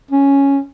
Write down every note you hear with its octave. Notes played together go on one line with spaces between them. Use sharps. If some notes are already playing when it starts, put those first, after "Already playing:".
C#4